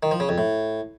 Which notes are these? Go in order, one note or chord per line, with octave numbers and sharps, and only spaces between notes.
D#3
F3
C#3
F2
A2